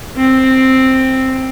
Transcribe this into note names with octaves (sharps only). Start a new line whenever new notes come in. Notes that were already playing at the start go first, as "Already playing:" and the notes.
C4